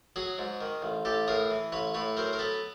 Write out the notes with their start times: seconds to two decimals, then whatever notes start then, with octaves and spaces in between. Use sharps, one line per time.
0.16 F#3 F#4 G#4
0.38 G#2
0.61 D#3
0.82 A1
1.05 A1 G4 A4
1.28 A2 G#4 A#4
1.51 E3
1.72 A1 B4 C#5
1.94 A2 B4 C#5
2.17 F#3 A#4 C5
2.33 A#4
2.39 B3 A4 B4